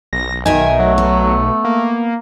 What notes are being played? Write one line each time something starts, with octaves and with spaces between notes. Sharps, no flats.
B1 A#6
D#3 D#4 A#4 E5 G#5
F#3 A3
B3
A#3